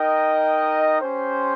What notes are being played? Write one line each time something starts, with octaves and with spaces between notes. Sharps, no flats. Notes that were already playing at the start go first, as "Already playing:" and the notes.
Already playing: D#4 A#4 D#5 G5
C#4 G4 C5